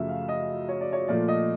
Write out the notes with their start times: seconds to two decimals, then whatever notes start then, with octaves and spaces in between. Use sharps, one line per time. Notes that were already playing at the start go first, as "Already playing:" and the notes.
Already playing: F#2 C#3 F3 A3 E5
0.09 F5
0.28 D#5
0.69 C#5
0.81 D5
0.92 C#5
1.08 A#2 F3 A3 D5
1.28 D#5